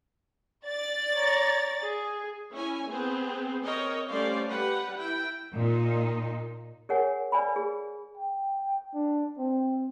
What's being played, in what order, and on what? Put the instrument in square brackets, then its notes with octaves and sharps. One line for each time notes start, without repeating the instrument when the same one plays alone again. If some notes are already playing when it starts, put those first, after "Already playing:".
[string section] D5 A6
[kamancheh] C#5 A#5
G#4
[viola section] C#4 E4 C#5 G#5
B3 C4 G#4
C4 A#4 C#5 D#5
G3 A3 C#4 C5 D5 F5
G3 G4 B4 F#5
E4 G5
[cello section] A#2 D#4
[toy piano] G#4 A#4 C#5 F#5 G#5
B4 D5 G#5 B5
G#4
[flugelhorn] G5
D4
C4